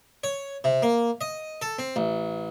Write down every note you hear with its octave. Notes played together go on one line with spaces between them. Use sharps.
C#5
C3
A#3
D#5
A4
C4
A1